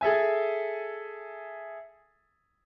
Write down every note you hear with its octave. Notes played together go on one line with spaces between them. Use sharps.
G#4 A4 E5 G#5